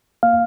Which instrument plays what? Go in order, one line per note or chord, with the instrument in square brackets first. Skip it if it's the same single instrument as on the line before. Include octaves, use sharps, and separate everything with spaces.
[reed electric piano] A#3 F5